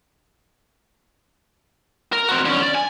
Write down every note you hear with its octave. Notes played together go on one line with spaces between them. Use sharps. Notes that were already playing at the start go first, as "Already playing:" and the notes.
A#4
C4 F#4
D3 C#4
D5
G#5